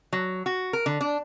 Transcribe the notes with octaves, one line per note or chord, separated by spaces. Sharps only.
F#3
F#4
A#4
D3
D4